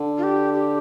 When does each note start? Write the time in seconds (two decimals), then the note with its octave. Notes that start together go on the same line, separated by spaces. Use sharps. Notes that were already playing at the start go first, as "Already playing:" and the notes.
Already playing: D3
0.18 F4
0.23 G4
0.53 G4